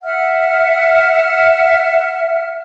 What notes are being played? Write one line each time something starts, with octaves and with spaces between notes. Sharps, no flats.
E5 F#5 F6